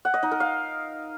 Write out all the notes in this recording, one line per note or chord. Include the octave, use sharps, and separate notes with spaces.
F#5
D#5
D#4
A#4
F5